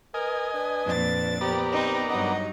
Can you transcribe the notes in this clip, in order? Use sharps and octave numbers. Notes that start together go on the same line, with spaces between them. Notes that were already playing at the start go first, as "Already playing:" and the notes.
A#4 B4 D#5 G#5
D4 B4
F2 A#2 D4 A6
B3 G4 A#4 C5 D5
C4 D#4
G2 F#3 D#4 D#5 F#5